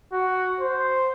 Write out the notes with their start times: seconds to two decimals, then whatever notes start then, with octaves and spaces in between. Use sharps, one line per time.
0.12 F#4
0.60 C5